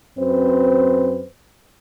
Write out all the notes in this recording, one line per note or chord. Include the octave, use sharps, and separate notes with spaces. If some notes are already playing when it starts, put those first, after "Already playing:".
F#2 C4 B4 C5